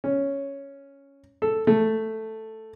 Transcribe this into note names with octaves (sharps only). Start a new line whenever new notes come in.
C#4
A4
A3